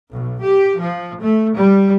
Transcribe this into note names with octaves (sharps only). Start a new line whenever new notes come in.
B1
G4
F3
A3
G3